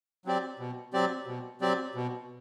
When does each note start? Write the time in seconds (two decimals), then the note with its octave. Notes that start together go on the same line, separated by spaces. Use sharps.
0.25 F#3 C4 G4 D5
0.59 B2
0.93 F#3 C4 G4 D5
1.27 B2
1.61 F#3 C4 G4 D5
1.95 B2